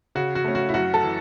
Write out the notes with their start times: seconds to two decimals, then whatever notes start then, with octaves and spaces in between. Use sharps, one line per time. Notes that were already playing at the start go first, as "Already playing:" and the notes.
0.15 C#3 F#4
0.35 F#4
0.44 A3 C#4
0.55 F#4
0.69 E4
0.74 F#2 F#4
0.94 A4
1.04 E3